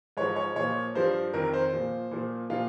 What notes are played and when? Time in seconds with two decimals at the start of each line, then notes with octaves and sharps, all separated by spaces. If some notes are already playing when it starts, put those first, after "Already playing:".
0.17 G#2 F3 C#5
0.36 C#5
0.56 A#2 F3 C#5
0.95 G2 F3 C5
1.33 F2 D#3 A#4
1.53 C5
1.73 A#2 F3
2.11 A#2 F3
2.50 A#2 F3 F4